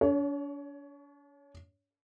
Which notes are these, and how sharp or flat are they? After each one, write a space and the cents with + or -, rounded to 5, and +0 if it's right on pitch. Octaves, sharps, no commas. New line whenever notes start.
D4 -45 C#5 +20